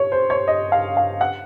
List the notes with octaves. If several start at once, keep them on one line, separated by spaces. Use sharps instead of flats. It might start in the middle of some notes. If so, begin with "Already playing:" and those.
Already playing: C#5
C5
C#5
D#5
F5
F5
F#5